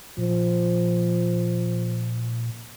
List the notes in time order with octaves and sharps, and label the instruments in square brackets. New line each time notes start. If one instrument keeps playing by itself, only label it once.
[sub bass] A#2 [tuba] F3